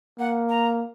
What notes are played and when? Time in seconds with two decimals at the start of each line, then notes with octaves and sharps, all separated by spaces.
0.19 A#3 F#5
0.49 A#5